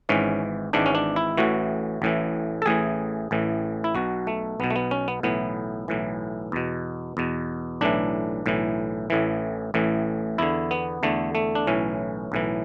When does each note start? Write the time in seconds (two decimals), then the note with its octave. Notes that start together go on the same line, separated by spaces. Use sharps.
0.09 G#1 G#2 E3 C#4
0.73 G#1 G#2 E3 D4
0.86 C#4
0.95 D4
1.16 E4
1.37 A1 A2 E3 F#4
2.02 A1 A2 E3
2.62 A4
2.66 A1 A2 E3 G#4
3.31 A1 A2 E3
3.84 E4
3.95 B1 B2 F#4
4.27 A3
4.60 B1 B2 B3
4.70 A3
4.76 B3
4.91 C#4
5.08 B3
5.23 B1 A2 E3 B3
5.88 B1 A2 E3
6.52 E2 B2
7.17 E2 B2
7.81 B1 A2 E3 D4
8.46 B1 A2 E3
9.10 A1 A2 E3
9.74 A1 A2 E3
10.38 E2 D3 E4
10.71 B3
11.03 E2 D3 A3
11.35 A3
11.55 D4
11.67 B1 A2 E3 C#4
12.32 B1 A2 E3